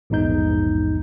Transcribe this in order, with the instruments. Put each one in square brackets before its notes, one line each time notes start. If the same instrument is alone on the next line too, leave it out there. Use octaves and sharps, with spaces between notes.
[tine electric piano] A#1 E2 G#2 D#4 G6